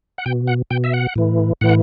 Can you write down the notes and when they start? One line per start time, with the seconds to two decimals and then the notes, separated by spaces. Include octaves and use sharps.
0.18 F#5
0.26 B2 G5
0.47 F#5
0.71 B2 G5
0.84 E5
0.94 F#5
1.16 A2 E3
1.61 A2 E3 F#5